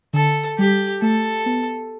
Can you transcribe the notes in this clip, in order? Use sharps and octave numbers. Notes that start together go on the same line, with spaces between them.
D3 A4
G3 G4
A3 A4
B3